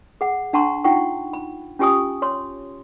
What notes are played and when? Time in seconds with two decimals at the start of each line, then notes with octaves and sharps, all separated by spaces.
0.21 G#4 F#5
0.53 D4 F#5 A5 A#5 C6 C#6
0.84 D#4 F4 F#5 G5 C#6
1.33 B5
1.79 C#4 F4 G4 G#5 C#6 D#6
2.22 C#5 C6